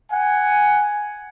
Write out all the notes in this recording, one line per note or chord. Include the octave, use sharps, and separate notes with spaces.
F#5 G#5